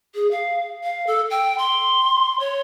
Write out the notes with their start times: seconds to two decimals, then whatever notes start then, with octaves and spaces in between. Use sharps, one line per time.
0.15 G#4
0.31 F5
0.84 F5
1.07 A4
1.30 G5
1.58 C6
2.40 C#5